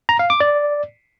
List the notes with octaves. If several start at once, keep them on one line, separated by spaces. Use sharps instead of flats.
A#5
F5
D6
D5